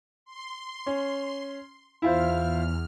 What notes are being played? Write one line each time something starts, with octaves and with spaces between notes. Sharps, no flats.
C6
C#4
E2 E4 F4 C5 F6